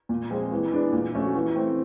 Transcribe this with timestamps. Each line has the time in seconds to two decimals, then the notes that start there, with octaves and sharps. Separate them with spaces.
0.09 A#2
0.30 F3 G#3 C4
0.51 E3
0.72 G#3 B3 D4
0.92 A#2
1.13 F3 A3 C#4 F#4
1.34 E3
1.55 A3 C4